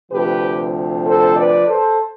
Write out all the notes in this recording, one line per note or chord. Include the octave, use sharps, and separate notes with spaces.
D2 C3 F3 G4 B4
A4 C5
B4 D5
A4 C5